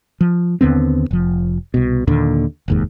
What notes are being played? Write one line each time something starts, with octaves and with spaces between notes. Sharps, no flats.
F3
D#2 D3 B3 C4
F1 F3
C2 B2
D#2 A#2 D3
F1 D#2 G#2